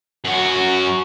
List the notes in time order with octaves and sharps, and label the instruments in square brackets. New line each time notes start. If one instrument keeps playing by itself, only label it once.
[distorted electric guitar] F#2 F#4